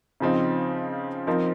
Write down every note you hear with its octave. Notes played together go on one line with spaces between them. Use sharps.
C#3 F3 C4 D#4
F3 C4 D#4 A#4